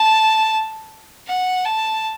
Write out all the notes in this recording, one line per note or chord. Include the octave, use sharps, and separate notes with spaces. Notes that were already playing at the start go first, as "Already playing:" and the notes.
Already playing: A5
F#5
A5